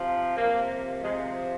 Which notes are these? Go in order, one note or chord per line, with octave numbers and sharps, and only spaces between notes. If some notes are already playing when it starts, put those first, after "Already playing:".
Already playing: C3 F3
C3 F3 A#3
C3 F3 G#3